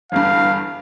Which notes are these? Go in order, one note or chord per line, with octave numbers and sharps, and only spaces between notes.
G1 E2 G2 F5